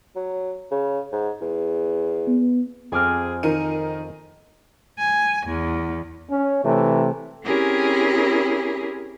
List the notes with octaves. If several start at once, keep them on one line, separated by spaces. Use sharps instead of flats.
F#3
C#3
G#2
E2
B3
F2 C4 G#4 G#5 D6 F6
D#3 D#4 A#4 C#7 D#7
G#5
E2
C#4
C3 E3 A3
C4 C#4 E4 G4 G#4 A#4